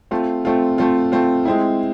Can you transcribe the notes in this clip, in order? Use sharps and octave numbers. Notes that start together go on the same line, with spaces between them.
A3 C4 F4
A3 C4 F4
A3 C4 F4
A3 C4 F4
G#3 C4 E4